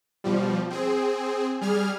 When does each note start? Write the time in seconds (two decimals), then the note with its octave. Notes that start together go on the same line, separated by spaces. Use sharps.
0.24 B2 F3 G3
0.70 C4 G#4
1.61 G3 G#4 F6 G#6